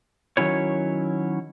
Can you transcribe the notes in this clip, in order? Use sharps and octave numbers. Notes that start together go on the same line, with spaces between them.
D#3 F#3 C#4 E4 C#5